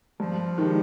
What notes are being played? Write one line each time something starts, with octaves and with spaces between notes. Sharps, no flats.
G2 F3
D#3 G#3 D#4 G4